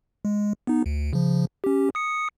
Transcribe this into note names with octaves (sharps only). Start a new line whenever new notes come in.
G#3
B3 D#4
D2
C#3 F3
C#4 G4
D#6 C#7